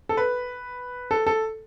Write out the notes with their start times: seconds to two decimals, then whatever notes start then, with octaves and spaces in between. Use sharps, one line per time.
0.09 A4
0.17 B4
1.11 A4
1.27 A4